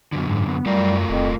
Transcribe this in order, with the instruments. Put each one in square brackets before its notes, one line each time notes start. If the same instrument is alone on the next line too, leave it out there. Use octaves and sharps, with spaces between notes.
[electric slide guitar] F#2 D3 [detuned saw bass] B2
[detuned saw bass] G#2
B3
[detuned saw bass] F#2 [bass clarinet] G3 [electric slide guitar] A3 F4 A#4
[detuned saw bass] D#1 [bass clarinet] F2